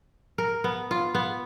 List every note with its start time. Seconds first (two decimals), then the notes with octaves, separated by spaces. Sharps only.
0.38 A#4
0.64 B3
0.91 F4
1.15 B3